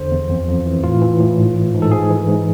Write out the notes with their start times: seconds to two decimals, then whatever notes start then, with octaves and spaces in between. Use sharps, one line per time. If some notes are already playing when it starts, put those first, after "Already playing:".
Already playing: E2 D3 C5
0.11 E2
0.29 F2
0.48 F2
0.66 E3
0.83 A2 F4
1.01 E3
1.20 A2
1.38 G#2
1.56 E3
1.74 G#2
1.82 A4
1.92 G#2 G#4
2.10 E3
2.28 G#2